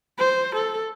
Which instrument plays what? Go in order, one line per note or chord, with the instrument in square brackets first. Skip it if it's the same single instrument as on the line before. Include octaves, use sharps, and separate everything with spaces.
[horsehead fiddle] C5
A4